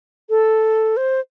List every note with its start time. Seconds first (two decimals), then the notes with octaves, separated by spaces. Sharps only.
0.30 A4
0.97 C5